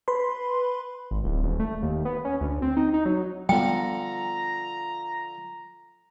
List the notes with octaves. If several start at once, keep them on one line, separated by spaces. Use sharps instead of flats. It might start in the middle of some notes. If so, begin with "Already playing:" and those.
B4 B5 C6
G#1
D1
D#1
A3
D#2
B3
C#4
D2
C4
D#4
D#4
F#3
D3 F3 G3 B3 G5 A#5